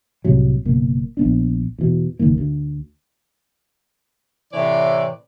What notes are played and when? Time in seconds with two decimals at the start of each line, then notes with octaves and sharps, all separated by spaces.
0.25 C2 A2 C3 F#3
0.65 F#1 B2 A#3
1.17 A#1 B3 D4
1.79 E2 B2
2.19 F#1 D#2 D#3 A#3
2.38 D2
4.53 A2 C3 E3 C#5 D5